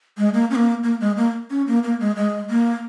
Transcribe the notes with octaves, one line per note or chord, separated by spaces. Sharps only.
G#3
A#3
C#4
A#3
A#3
G#3
A#3
C#4
A#3
A#3
G#3
G#3
A#3